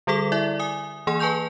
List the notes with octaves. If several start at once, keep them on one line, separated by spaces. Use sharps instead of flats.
D3 G3 G#4 A4 D6
E4 D5 E5
G#5 D#6
E3 A#3 G#4 G#5 C6
B4 G#5 A5 C#6 G6 F7